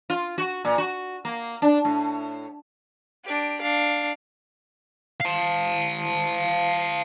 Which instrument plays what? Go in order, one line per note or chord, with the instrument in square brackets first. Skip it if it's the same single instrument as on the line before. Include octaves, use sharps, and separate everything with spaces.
[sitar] F4
F#4
A#2
F#4
A#3
D4
A2
[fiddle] D4 G4
D4 F5
[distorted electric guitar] F5 A5